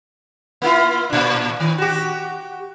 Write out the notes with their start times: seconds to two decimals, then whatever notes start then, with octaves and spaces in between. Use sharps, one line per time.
0.62 A#3 E4 F4
1.10 A2 D4
1.60 D#3
1.78 F#4 G4